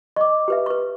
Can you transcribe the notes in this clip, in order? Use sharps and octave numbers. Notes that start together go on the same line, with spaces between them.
D#5 C#6 D6
G4 B4 E5
B4 C#6